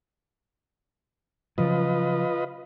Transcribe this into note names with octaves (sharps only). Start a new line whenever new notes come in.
C#3 F3 F#3 F4 B4 D#5